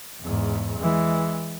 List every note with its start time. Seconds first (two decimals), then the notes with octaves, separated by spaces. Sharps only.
0.22 E2 G#2
0.79 E3 G#3